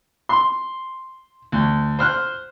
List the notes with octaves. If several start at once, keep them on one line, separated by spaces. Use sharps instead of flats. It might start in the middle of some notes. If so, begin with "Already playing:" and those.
C6
D2
C5 F6 F#6